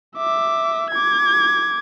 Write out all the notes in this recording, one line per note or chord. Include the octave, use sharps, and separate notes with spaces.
E5 D6
D6 G#6